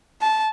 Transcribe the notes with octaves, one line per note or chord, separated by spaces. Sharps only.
A5